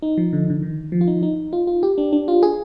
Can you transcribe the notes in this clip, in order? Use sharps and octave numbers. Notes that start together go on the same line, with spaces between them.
D#4
F3
D3
D3
D#3
F3
F4
D#4
D#4
F4
F4
G4
D4
D4
F4
G#4